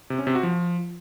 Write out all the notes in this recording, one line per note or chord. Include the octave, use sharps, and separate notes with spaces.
C3
C#4
C3
F#4
F3